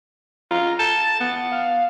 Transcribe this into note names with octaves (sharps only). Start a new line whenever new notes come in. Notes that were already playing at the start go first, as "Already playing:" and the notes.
F4 A#5
A5 G6
A6
B3
F5